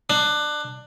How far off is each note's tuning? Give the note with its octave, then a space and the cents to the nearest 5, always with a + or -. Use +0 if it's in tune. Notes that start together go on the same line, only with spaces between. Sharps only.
D4 +20